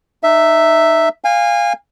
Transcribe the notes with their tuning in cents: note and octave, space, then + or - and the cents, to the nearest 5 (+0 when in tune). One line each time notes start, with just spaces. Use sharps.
D#4 -25 E5 +0
F5 +0 G#5 -30